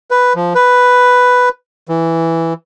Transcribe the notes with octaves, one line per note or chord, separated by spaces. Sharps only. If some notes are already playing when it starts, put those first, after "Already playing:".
B4
F3
B4
E3